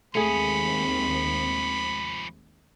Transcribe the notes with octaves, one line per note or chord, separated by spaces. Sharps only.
D#2 F3 G#3 A3 C4 C#4 G#4 B5